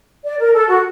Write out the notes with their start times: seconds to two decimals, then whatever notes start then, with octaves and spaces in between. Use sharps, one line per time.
0.24 D5
0.39 A#4
0.54 A4
0.68 F#4